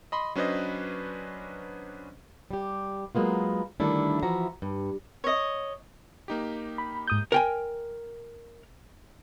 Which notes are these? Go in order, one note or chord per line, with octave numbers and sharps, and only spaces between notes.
D#5 B5 C6
F#3 C#4 D4 B4 C5 D#5
G3 G4
F#3 G#3 A#3 B3 F4
D3 D#3 G3 A3 D4 E4
E3 F3 F#4 E5 A#5
G2
C#5 D#5
A#3 D#4 G4
B5
G#2 D#6 G6
A#4 G5 G#5